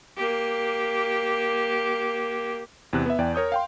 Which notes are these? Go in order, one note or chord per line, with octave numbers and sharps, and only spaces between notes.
A#3 G4
E2 C3 F#6
B3 E5
E2 D5 G5
A#4 C#5 D#6 G6
F5 G5 C6